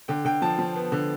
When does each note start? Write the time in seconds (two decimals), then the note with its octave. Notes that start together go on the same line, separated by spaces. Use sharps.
0.08 D3 G5
0.25 D3 G5
0.42 F3 A5
0.58 F3
0.76 B3
0.92 D3